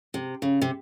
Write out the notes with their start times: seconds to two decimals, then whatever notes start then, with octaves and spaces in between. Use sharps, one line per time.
0.14 C3
0.42 C#3
0.62 C3